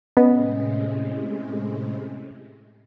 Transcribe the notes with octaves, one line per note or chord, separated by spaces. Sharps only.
A2 C3 G#3 B3 C#4 D#5